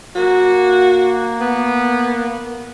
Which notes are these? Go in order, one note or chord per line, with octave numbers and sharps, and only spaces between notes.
A#3 F#4
B3